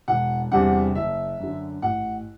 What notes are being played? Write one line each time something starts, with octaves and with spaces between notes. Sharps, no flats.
E1 F#5
E2 C3 G3 D4 F#5
F#1 E5
F#2 D3
A1 F#5